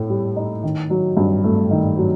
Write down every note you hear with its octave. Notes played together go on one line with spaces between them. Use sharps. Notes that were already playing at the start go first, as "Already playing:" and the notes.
Already playing: A2 A4
G3
D#4
D#3
F#3
G2
A3
D#3
F#3